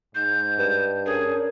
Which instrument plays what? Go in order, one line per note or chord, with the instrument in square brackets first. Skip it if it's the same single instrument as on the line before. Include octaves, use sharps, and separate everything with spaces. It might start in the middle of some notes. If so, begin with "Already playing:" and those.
[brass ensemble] G#2 [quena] G6
[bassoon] G2
[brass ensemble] C#4 D4 A#4 [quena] G#4